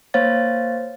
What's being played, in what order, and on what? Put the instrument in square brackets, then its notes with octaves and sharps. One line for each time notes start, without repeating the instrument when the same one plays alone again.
[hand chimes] A#3 C5 C#5 F5 A6